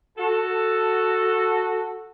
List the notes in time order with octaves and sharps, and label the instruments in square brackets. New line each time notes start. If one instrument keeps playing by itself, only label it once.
[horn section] F#4 A4